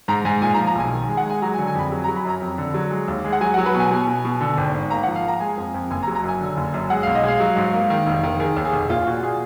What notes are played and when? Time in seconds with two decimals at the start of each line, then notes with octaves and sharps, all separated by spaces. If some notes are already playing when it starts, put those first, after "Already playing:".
0.08 G#2 A#5
0.25 G#2 G#5
0.42 A#2 G#5
0.54 A#5
0.58 F3
0.67 A#5
0.75 B1 G#5
0.92 D#3
1.08 G#3
1.17 F#5
1.25 G#3 G#5
1.42 F#3 A#5
1.54 G#5
1.58 D3
1.67 G#5
1.75 F2 B5
1.92 F#3
2.04 F#3 A#5
2.16 B5
2.25 F#2 A#5
2.42 F2
2.58 D3
2.74 F#3
2.91 G#3
3.08 D#2
3.24 G#3
3.32 F#5
3.41 F#3 G#5
3.54 F#3 F#5
3.66 B4
3.74 B2 G#5
3.91 B2
4.07 B2
4.25 B2
4.41 D3
4.57 G#1
4.74 G#1
4.90 A#3 A#5
5.03 F3 F#5
5.16 F5
5.24 A#3 A#5
5.40 G#3 G#5
5.57 F2
5.74 F2
5.91 F#1 G#5
6.03 A#5
6.07 F#3
6.15 A#5
6.24 F#2 G#5
6.41 D3
6.57 F#1
6.74 F#2
6.90 G#3 F#5
7.03 B1 F5
7.15 D#5
7.23 G#3 F5
7.40 F#3
7.56 G#2
7.73 A#3
7.90 D#3
8.07 F1
8.23 D#3
8.40 D#3 G#4
8.56 D#2
8.65 G#4
8.73 F1
8.90 A#2 F4
9.06 A#2 F#4
9.23 A#2 G#4